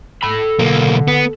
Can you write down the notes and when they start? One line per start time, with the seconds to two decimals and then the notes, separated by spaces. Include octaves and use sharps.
0.23 A4 B5
0.59 B1 D3 A#3
1.08 B3